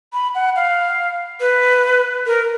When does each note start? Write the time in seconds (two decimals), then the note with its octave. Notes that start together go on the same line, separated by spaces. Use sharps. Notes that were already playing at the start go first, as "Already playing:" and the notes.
0.13 B5
0.35 F#5
0.56 F5
1.40 B4
2.26 A#4